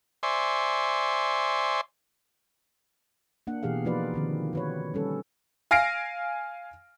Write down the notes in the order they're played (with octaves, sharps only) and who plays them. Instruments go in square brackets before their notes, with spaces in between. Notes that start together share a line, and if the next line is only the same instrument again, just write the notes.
[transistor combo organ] C5 D5 E5 G#5 C6 C#6
[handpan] A#3 D4 F#5
B2 E3 G4 G#4 F5
F3 A#3 D#4 F4 B4 D5
D3 D#3 C4
F#4 B4 C#5
G3 C#4 A4
[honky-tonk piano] F5 G#5 F6 A#6 C7 D7